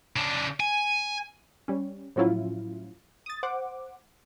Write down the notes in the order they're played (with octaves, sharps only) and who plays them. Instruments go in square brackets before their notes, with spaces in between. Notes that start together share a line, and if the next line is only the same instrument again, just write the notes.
[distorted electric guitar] C#3 D4
G#5
[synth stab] G3 C#4
A2 F3 F#3 C#4 E4 F4
D#6 A6
C5 F#5 D6